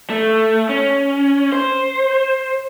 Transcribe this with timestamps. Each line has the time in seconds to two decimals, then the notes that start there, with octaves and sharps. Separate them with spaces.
0.10 A3
0.69 C#4
1.52 C5